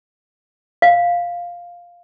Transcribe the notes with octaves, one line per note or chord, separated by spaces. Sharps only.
F5